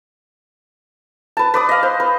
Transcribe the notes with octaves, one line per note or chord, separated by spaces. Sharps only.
B4 A5
B4 D5 D#6
D#5 F5
C5
B4